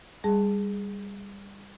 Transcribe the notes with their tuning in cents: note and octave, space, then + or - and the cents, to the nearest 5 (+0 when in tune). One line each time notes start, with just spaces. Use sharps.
G3 +25 G#4 +0 A5 +0